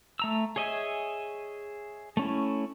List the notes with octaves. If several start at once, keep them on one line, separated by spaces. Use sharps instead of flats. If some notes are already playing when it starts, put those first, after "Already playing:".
A3 A#5 E6
G#4 C#5 D#5 E5 G#5
A3 C#4 E4